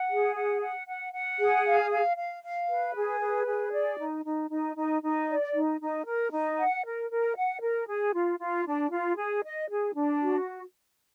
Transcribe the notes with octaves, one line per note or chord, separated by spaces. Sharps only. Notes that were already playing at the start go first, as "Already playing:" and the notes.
Already playing: F#5
G#4
F#5
F#5
F#5
F#5
G#4
F5
F5
F5
F5
B4
G#4
B4
G#4
D5
D#4
D#4
D#4
D#4
D#4
D5
D#4
D#4
A#4
D#4
F#5
A#4
A#4
F#5
A#4
G#4
F4
F4
D4
F4
G#4
D#5
G#4
D4
F#4